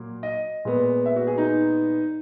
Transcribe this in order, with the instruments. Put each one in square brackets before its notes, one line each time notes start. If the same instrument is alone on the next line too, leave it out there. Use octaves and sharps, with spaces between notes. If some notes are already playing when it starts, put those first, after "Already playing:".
Already playing: [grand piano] A#2 F#3 A#3
D#5
A#2 G#3 B3
E5
F#4
G#4
D#4